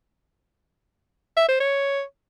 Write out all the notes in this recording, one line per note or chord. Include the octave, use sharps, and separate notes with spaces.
E5
C5
C#5